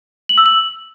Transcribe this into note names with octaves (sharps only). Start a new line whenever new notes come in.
F#7
E6
F#7